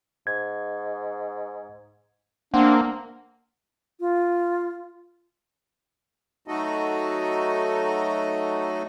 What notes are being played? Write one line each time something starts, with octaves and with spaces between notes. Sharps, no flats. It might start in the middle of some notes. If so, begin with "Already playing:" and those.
G#2 G#6
A#3 C4 D4 F#5
F4
F#3 A3 D#4 F#4 A4 D#5